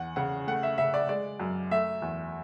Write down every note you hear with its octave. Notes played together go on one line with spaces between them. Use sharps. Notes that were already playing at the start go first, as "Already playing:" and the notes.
Already playing: E2 F#5
C#3 F#5
A3 F#5
E5
C#3 E5
D5
G#3 D5
F#2
A3 E5
E2